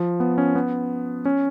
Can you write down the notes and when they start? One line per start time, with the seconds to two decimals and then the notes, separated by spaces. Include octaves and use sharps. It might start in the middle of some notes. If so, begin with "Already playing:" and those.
Already playing: F3
0.20 B3
0.38 C#4
0.55 B3
1.25 C#4